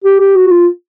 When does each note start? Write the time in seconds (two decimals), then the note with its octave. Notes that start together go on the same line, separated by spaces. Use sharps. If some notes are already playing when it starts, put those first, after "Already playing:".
0.04 G4
0.20 G4
0.36 F#4
0.47 F#4
0.51 F4